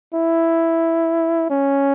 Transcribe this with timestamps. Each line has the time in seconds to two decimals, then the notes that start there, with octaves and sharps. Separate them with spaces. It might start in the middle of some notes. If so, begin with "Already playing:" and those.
0.15 E4
1.50 C#4